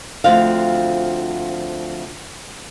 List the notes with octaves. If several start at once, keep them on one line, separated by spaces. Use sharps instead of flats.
D2 F3 C4 F5